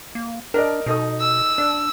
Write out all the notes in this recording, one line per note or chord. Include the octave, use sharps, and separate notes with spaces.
A#3
D4 A#4 D5 D#5
B2 D#4 A4 D#6
E6
D4 D5